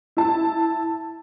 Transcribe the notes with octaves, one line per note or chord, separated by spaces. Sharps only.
E4 A5